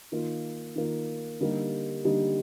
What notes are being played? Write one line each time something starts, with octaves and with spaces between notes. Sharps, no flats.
D#3 A#3 F4
D#3 A#3 F4
D3 G3 A#3 D#4 G4
D3 G3 A#3 D#4 G4